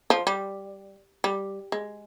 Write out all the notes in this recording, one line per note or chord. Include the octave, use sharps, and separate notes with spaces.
F3
G3
G3
G#3